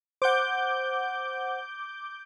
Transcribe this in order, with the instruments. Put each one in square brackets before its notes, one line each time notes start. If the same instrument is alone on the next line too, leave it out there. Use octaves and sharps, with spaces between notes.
[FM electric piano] C5 F#5 [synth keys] D6 G6